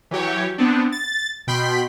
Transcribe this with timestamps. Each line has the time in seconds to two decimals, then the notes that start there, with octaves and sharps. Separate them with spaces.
0.11 E3 F#3 G4 C#5
0.58 B3 C4 D4
0.92 A6
1.47 B2 G5 B5 C6 B6